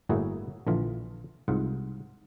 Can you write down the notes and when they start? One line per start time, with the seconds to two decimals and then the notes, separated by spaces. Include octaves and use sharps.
0.09 G1 A2 A#3 E4 F#4 G#4
0.67 A#1 D3 E3 F4
1.48 C2 G#2 F4 F#5